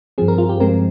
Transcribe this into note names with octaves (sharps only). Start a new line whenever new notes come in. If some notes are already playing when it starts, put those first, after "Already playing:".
G2 F3 C4 G#4
A#4
F4
G4
G2 F3 G#3 C4 A#4